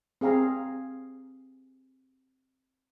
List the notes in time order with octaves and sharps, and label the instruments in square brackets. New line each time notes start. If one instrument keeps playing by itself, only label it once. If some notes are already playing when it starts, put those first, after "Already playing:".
[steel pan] C4 G#4 F5 A#5